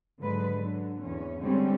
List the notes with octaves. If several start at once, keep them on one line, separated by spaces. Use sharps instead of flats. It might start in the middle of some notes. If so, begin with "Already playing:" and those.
G#2 D3 F#3 G#3 B4
D3 F#3
E2 C#4
D3 G3 G#3 C4 C#4 G4